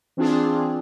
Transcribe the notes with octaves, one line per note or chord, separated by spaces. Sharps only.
E3 C4 D4 F4 G#4